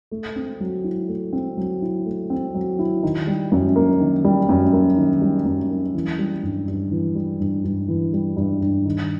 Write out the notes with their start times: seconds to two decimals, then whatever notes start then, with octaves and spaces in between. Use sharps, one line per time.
0.11 A3
0.36 C4
0.60 F#3
0.84 E4
1.09 A3
1.33 C4
1.57 F#3
1.82 E4
2.06 A3
2.30 C4
2.54 F#3
2.79 E4
3.03 D#3
3.27 G3
3.52 F#2
3.76 A#3
4.00 D#3
4.25 G3
4.49 F#2
4.73 A#3
4.97 D#3
5.21 G3
5.45 F#2
5.70 A#3
5.95 E3
6.19 G3
6.43 G2
6.68 G2
6.91 E3
7.15 G3
7.40 G2
7.64 G2
7.88 E3
8.13 G3
8.37 G2
8.61 G2
8.86 D#3